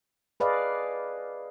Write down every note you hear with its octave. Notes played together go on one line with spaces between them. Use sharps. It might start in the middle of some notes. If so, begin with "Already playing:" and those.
G#4 B4 D5 D#5 F5